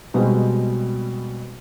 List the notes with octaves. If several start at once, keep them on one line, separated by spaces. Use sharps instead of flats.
B2 G3 G#3 B3 C4 F#4